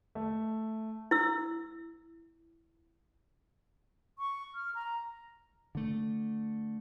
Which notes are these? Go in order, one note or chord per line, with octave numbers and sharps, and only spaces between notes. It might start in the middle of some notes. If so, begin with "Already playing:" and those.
A3
E4 E6
C#6
F6
A#5
D3 A3